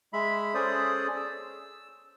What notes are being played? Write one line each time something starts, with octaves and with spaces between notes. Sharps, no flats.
G#3 E5 B5
C#4 G#4 A4 C5 D5 D#6
E6